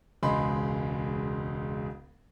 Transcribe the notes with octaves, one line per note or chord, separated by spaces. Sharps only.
E1 C#2 G#3 G#4 B5 C6